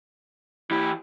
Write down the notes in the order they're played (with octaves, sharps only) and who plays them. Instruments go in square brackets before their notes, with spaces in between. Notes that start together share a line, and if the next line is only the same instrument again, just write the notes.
[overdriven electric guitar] E3 G4 [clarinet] E4